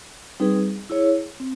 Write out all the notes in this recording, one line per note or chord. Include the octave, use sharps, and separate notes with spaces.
G3 C4 D#4 G#4 B4
E4 G#4 C#5
C4